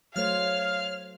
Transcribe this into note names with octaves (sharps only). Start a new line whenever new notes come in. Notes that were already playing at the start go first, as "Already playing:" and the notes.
F#3 A3 C5 C#5 F5 F6